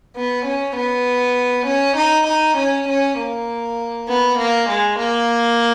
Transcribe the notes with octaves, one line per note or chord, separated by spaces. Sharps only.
B3
C#4
B3
C#4
D#4
D#4
C#4
C#4
A#3
B3
A#3
G#3
A#3